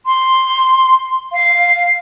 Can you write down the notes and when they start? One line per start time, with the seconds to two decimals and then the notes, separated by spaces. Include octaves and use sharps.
0.05 C6
1.32 F5